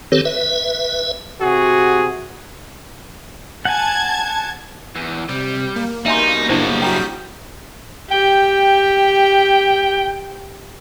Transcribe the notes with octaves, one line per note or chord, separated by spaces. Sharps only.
D#3 C4 G4 A4 B4 C#5
B4 E5
C3 F#4 G#4
F#5 G#5 A5 G#6
E2 E3
C3 G3
A#3
B2 G3 D#4 E5 G#5 C6
F#2 C#3 D4 E4 C5
G3 F#4 G5 A#5 D#6 B6
G4 G5